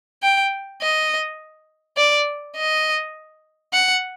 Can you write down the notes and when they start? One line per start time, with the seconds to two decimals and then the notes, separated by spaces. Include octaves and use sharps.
0.23 G5
0.81 D#5
1.97 D5
2.57 D#5
3.74 F#5